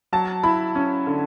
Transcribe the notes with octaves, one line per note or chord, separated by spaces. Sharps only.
F#3 A5
E4 B5
C#4
D3